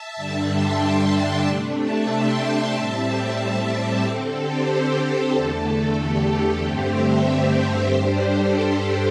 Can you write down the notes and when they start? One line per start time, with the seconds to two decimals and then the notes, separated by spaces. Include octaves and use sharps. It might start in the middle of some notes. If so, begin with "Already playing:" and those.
Already playing: E5 A5
0.16 G2 D3 G3 D4
0.48 G5 C6
0.81 E5 A5
1.13 E5 A5
1.45 C3 A3 D4
1.78 E5 A5
2.10 G5 C6
2.42 G5 C6
2.75 A2 G3 C4 E5 A5
3.72 G4
4.04 D3 C4 A4
4.37 G4 C5
4.69 A4
5.01 G4
5.34 E2 D3 A3 A4
5.98 G4
6.31 A4
6.63 G2 D3 A3 C4 G4 C5
6.95 C5 E5
7.28 G4 C5
7.92 G2 G3 D4 G4 C5
8.25 A4
8.57 G4